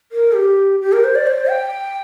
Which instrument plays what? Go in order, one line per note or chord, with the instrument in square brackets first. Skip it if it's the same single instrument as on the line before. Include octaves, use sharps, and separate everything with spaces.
[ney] A#4
G4
G4
A#4
C5
D5
C5
G5